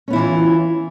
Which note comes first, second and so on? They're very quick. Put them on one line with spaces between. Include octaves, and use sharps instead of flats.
C#4 B3 E4 E3 F4